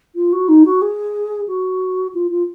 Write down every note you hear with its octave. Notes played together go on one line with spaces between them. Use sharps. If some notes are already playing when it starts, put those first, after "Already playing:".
F4
F#4
D#4
F#4
G#4
F#4
F4
F4